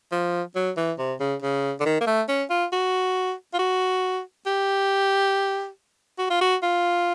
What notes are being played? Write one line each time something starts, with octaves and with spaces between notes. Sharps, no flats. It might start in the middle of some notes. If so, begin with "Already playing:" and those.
F3
F#3
E3
C3
C#3
C#3
D3
D#3
A#3
A3
C#4
F4
F#4
F4
F#4
G4
F#4
F4
F#4
F4